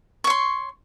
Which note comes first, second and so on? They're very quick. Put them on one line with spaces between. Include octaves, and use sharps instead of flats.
C#6 C#5 C6